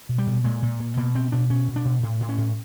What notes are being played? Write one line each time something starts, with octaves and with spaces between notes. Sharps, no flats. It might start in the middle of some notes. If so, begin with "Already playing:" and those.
B2
G3
B2
A#2 G#3
A#2
A#2
B2 A#3
B2 C4
B2 D4
B2 C#4
B2
D4
B2
A2
A2
C#4
A2